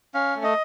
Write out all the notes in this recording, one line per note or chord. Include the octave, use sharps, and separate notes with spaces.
C#4 F5
A3
D#5